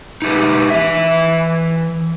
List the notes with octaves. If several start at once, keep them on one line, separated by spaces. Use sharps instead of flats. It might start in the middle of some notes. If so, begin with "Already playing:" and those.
D#4 E4 G4 B4
E3 E5